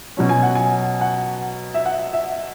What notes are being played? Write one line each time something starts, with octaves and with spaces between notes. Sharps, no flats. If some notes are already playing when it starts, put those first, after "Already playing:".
B2 F#3 C#4
G#5
F#5
G#5
F#5
E5
F#5
E5